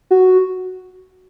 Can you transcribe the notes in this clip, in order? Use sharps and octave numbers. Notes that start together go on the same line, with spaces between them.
F#4